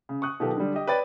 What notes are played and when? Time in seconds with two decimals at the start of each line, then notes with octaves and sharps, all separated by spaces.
0.09 C#3
0.22 C#6 D#6 F#6
0.40 B2 D#3 F#3 F4 G4 A4
0.57 D3 G3
0.75 G4 D#5
0.87 B4 C#5 D5 G5 B5 A6